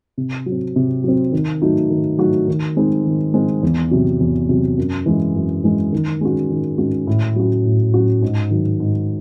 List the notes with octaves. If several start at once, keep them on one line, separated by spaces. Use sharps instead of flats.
C3
F#3
C4
C3
F#3 C4
D#3
F#3 A3 D#4 F#4
D#3
F#3 A3 D#4 F#4
D#3
G#3 C4 D#4
D#3
G#3 C4 D#4
E2
C3 F#3
E2
C3 F#3
F#2
E3 G#3
F#2
E3 G#3
D#3
G#3 C#4 F#4
D#3
G#3 C#4 F#4
A2
F#3 C#4 F#4
A2
F#3 C#4 F#4
G#2
D#3 F#3
G#2